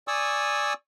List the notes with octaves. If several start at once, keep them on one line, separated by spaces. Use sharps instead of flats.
D5 G#5 C#6 D#6 E6